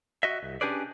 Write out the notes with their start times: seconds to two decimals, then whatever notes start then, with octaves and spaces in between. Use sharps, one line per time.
0.23 F#4 D#5 E5
0.43 C2
0.61 C#4 D4 G4 G#4 B4 D5